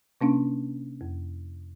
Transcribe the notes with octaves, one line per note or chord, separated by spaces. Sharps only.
C3 A#3 C#4 D4
F2